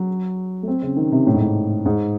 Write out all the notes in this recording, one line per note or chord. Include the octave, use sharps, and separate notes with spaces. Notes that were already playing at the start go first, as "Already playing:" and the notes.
Already playing: F#3
A3
C4
C#3
D#3
C3
A2
G#2
A2
G#2